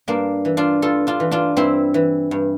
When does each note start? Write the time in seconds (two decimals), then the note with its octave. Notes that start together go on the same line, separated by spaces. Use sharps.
0.08 G2 A#3 D4
0.45 E3
0.57 D4 F4
0.82 G2 F4 A4
1.07 D4 F4
1.20 E3
1.31 D4 F4
1.56 G2 C4 E4
1.94 E3
2.31 G2